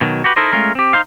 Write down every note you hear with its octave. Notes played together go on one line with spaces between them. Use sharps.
B2 D#3 F#3
F#4 G4 B4
D#4 E4 A4 A#4 C5 D#5
G#3 A3 C#4 F4 G#4 A#4
C4 G4
D#4 C5 F5